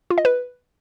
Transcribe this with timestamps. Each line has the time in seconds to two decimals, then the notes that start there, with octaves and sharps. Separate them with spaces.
0.10 F4
0.18 D#5
0.25 B4